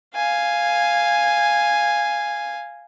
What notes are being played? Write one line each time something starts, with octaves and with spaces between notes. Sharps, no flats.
F5 G#5